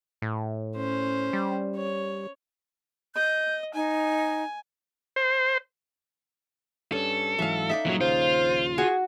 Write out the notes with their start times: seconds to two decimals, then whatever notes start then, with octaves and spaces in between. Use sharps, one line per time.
0.22 A2
0.76 C#4 C5
1.33 G3
1.76 C#5
3.15 D#5 G6
3.74 D#4 G#5
5.16 C5
6.92 G2 C#4 A4
7.39 G#2 E3 F#3 E5 F5
7.69 D#4 A4 D5 E5
7.85 G2 A#2 C#3 E3 F#3
8.01 A#1 D#2 C#3 F4 C5
8.78 F#4 G#4